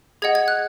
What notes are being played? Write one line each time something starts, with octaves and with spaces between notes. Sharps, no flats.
G#4 D#5 F#5 G#6
G#6
F#6